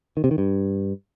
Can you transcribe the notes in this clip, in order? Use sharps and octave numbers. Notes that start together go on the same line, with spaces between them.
D#3
C3
D#3
G2